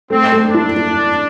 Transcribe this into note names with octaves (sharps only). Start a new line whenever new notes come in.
A3 C4
A3
D4
E4
E4